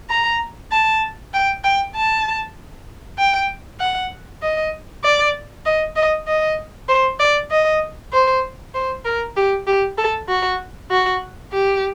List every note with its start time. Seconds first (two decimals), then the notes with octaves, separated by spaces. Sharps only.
0.10 A#5
0.71 A5
1.33 G5
1.64 G5
1.95 A5
3.19 G5
3.80 F#5
4.42 D#5
5.04 D5
5.66 D#5
5.96 D#5
6.27 D#5
6.89 C5
7.20 D5
7.51 D#5
8.13 C5
8.75 C5
9.05 A#4
9.36 G4
9.67 G4
9.98 A4
10.28 F#4
10.91 F#4
11.52 G4